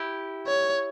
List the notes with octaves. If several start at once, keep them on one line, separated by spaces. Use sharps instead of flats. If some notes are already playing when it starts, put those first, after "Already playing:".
Already playing: E4 G4
C#5